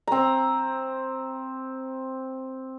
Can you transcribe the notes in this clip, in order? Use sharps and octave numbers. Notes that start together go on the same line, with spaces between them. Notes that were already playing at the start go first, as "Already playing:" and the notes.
C4 A#5